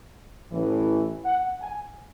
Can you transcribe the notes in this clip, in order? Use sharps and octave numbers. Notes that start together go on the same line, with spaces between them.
A1 A2 E3
F#5
G#5